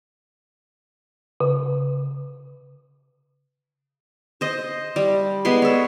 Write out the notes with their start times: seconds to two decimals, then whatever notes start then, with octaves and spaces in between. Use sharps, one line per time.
1.40 C#3
4.41 C5 D#5
4.96 G3
5.45 G#3 B3 B5 C6
5.62 A4 C#5